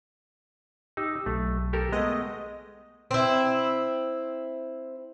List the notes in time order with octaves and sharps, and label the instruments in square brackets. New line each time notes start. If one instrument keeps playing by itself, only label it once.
[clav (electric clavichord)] D#4 [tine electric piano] G4 E6
[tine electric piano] B1 [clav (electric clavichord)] A3
[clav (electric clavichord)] G4 A4 A#4
[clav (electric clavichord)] G#3 A3 [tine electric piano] B3 [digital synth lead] D#5
[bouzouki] C4 E4